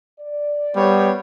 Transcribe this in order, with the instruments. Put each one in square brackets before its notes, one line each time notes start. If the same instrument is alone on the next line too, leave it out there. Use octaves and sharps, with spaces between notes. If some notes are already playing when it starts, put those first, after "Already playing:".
[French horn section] D5
[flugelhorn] G3 [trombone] B3 [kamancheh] C5 C#5